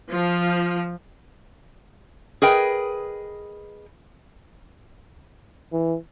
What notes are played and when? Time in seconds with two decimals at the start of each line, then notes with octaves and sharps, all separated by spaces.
0.12 F3
2.42 G#4 A#4 B4 D#5 G5
5.73 E3